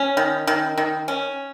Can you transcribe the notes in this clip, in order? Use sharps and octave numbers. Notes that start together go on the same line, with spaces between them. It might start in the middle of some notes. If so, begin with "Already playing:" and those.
Already playing: C#4
D#3
D#3
D#3
C#4